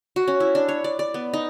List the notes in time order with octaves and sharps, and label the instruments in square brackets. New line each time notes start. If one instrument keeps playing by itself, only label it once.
[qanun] F#4
C#4
E4
D4
C#5
D5
D5
B3
D#4